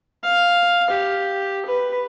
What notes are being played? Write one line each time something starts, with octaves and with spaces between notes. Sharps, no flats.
F5
G4
B4